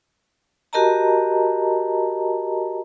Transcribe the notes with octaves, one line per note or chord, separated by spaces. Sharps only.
F#4 G4 A#4 D#5 A5 A#5